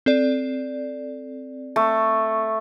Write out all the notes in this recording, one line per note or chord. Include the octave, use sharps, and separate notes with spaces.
C4 A4 D5
A3